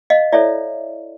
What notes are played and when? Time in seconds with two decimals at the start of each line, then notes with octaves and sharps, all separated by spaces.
0.10 D#5 F5
0.32 E4 A4 C#5 D5 E5